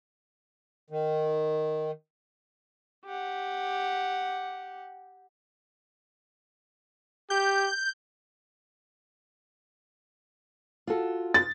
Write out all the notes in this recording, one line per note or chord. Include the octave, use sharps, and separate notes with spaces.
D#3
G4 F#5
G4 G6
F4 F#4 A4
A6